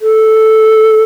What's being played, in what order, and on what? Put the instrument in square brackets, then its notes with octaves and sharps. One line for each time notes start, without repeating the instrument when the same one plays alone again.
[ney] A4